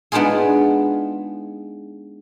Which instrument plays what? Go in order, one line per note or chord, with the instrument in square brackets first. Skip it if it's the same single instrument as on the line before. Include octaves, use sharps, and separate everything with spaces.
[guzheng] G#3 B3 D4 D#4 F4 G#4